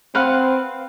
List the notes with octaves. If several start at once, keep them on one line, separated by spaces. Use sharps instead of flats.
C4 B4 F5 F#5